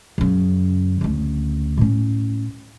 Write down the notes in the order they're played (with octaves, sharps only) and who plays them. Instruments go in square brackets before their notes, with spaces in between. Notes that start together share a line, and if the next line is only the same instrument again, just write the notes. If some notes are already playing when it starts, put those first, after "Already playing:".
[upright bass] F#2 C#3
D2 C#3
A2 C#4